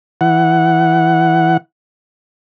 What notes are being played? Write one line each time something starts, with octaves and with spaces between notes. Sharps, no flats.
E3 F#5